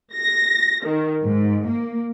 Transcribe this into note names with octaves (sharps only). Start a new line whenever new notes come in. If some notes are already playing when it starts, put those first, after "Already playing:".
A#6
D#3
G#2
A#3